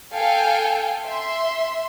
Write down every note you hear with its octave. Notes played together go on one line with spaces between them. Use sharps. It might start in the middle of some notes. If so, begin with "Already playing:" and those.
A4 F5 G5 G#5
E5 C6